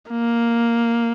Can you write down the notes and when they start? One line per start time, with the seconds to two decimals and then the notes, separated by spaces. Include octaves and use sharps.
0.10 A#3